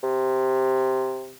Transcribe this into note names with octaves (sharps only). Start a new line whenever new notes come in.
C3